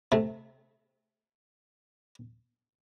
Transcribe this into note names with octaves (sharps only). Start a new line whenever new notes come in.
C3 A3